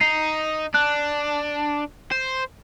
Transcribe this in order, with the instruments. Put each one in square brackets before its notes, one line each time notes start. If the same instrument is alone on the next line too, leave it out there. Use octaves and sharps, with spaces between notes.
[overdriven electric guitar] D#4 [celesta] C7
[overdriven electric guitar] D4 [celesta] F#6
[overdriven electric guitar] C5